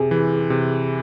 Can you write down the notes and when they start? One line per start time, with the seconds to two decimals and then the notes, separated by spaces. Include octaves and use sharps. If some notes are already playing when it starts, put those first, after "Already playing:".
Already playing: C3 G#4
0.11 E3
0.50 C3